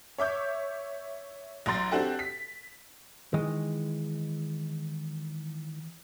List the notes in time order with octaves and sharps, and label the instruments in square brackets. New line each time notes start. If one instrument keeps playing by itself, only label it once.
[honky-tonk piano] C#5 E5 D6 G6
A1 F#3 A#5 C6 A6
C4 D4 F#4 G4 A4
B6
[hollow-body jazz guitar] D#3 E3 G#3 D#5